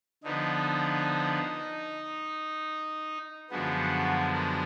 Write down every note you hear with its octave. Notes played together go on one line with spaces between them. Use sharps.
D3 F3 B3 D#4
F#2 D3 F3 G#3 B3 F#4
A#4